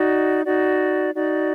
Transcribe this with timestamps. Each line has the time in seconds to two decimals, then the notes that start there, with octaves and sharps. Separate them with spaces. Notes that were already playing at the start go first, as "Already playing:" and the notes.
Already playing: D#4 F#4 D5
0.45 D#4 F#4 D5
1.14 D#4 F#4 D5